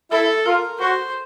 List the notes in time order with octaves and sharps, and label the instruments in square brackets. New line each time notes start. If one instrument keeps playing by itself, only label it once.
[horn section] E4 [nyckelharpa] A4
[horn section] F4 [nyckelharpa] A#4
[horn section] F#4 [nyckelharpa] C5